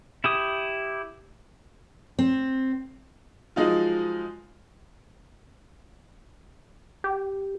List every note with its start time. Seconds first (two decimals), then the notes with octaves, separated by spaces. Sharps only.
0.24 E4 G4 D#6
2.19 C4
3.56 F3 F#3 G#3 D#4 F4
7.04 G4